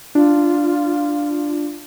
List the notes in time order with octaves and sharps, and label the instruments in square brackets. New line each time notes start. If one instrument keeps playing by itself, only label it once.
[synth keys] D4 [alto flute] F4